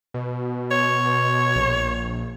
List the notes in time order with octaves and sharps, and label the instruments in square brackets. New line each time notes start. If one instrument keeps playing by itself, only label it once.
[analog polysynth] B2
[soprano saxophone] C#5
[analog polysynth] A#1